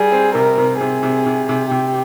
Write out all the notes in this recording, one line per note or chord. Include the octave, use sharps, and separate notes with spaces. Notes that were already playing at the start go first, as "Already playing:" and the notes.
Already playing: G3 G#4
C4
C3 A#4
C3
C3 G#4
C3
C3
C3
C3 G4